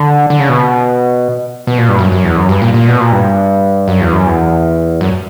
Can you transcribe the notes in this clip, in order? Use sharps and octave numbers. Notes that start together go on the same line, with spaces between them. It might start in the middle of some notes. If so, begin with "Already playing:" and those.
Already playing: D3
D3
C#3
B2
B2
A#2
G2
F#2
F#2
E2
F#2
G2
A#2
A#2
B2
A#2
G2
F#2
E2
F#2
E2
F#2